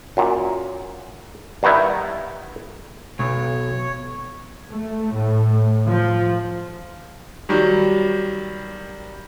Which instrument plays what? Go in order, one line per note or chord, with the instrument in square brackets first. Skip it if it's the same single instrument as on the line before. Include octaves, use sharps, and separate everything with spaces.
[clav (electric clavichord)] F#2 A#2
G2 D#3 B3 D#4 E4
[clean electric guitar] B1 [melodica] C#5
[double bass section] A3
A2
F3
[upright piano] D#3 F#3 G3